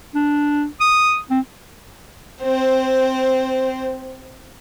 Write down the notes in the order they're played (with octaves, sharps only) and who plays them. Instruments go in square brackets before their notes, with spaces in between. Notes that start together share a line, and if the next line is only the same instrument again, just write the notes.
[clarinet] D4
D#6
C4
[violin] C4 C5